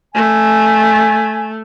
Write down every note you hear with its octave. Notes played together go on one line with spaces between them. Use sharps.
A3 G#5